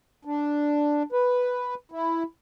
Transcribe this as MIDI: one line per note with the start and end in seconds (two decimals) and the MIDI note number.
0.25 1.03 62
1.12 1.75 71
1.92 2.23 64